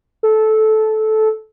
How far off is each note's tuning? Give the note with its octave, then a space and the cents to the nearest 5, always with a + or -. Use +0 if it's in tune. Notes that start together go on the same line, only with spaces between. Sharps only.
A4 -15